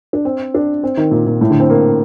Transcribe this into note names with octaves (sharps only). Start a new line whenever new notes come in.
D4
C4
D4
C4
D#3
A#2
A#2
A2
D3
C4
A#3